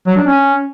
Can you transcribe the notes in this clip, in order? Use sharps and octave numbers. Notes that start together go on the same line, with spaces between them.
F#3
D4
C#4